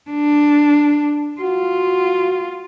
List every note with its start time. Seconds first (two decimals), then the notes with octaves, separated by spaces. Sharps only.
0.10 D4
1.41 F4 F#4